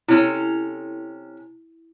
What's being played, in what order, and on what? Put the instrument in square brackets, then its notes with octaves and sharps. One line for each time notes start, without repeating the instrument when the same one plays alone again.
[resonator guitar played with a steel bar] C3 C#4 A4 [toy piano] E4